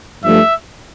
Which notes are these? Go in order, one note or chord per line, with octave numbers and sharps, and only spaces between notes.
G2 F3 A3 E5